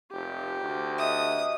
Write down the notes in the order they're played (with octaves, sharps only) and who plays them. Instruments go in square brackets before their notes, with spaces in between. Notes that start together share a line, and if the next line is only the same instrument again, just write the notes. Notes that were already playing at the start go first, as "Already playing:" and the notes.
[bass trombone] F1 [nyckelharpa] G4
[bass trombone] D2
[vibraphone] D#5 E5 [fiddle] D#6